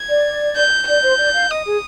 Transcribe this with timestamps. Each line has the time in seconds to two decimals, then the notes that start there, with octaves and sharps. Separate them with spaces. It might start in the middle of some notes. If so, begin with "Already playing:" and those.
Already playing: G#6
0.09 D5
0.56 G6
0.88 D5 G6
1.03 C5
1.19 D5
1.35 F5
1.50 D#5 D#6
1.66 G#4